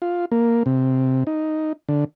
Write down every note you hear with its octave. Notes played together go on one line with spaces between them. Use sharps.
F4
A#3
C3
D#4
D3